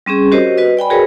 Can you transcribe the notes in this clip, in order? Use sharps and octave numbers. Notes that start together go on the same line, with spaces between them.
G3 C4 C#4 G#4
F#4 G4 A#4 C5 C#5 D#5
F#4 B4 D#5
D5 G5 G#5 B5
F#4 G#4 A#4 B4 C#5 D#5